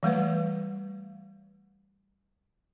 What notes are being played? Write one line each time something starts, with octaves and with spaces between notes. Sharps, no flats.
E3 G3 A3 B4